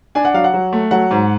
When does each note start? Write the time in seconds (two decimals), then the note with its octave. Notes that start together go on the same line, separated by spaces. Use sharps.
0.15 D4 G#5
0.25 F#5
0.34 F#3 F5
0.44 F#5
0.54 F#3
0.73 A3
0.91 F#3 F#5
1.11 G#2